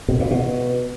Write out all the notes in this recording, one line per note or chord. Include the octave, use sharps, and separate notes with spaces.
B2
A#2
B2